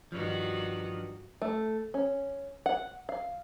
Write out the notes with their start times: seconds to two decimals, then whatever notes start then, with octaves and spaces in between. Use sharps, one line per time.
0.12 G2 D#3 F3 G3 F#4
1.42 A3
1.94 C#4
2.66 F#5
3.09 F5